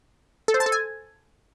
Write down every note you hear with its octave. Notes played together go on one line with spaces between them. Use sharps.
A4
C5
A5
A4
G#5